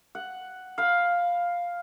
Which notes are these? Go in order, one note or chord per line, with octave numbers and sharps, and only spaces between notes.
F#5
F5 B5